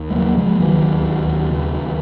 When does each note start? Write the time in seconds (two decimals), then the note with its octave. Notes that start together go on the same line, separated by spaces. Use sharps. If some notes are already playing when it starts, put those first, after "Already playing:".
Already playing: D#2
0.10 G#3
0.15 C#3 F#3 A#3
0.37 C#3 F3 G#3
0.59 D#2 D#3 F#3
0.82 D#2
1.05 D#2
1.27 D#2
1.50 C#3
1.73 D#2